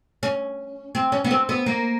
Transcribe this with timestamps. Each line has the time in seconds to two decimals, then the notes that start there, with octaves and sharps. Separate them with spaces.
0.23 C#4
0.95 C4
1.12 C#4
1.24 B3
1.31 C4
1.49 B3
1.66 A#3